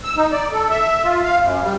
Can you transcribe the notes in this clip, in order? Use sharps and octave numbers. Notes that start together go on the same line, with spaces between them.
E6
D#4
D5
A4
E5
F4
F5
F#2
G3